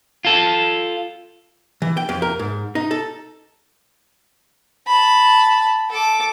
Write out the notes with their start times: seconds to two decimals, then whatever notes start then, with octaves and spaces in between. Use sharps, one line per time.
0.25 F4 A4
1.82 E3
1.97 G5
2.09 F2
2.22 A#4
2.39 G#2
2.75 D#4
2.91 A4
4.87 A5 B5
5.90 A4 D6